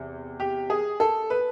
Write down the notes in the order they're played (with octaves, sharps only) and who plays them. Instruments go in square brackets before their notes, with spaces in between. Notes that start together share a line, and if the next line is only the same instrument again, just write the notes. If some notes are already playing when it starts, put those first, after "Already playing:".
Already playing: [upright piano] E2 C3
G4
G#4
A4
B4